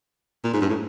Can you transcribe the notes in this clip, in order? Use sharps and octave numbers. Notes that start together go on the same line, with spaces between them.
A#2
G#2
G2
A2